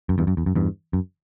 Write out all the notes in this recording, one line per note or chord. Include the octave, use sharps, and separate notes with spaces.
F#2
E2 G2
F#2
E2
F#2
E2 G2
F#2